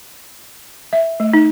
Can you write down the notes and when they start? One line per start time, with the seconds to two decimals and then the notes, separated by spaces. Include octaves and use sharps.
0.93 E5
1.20 A3
1.34 D#4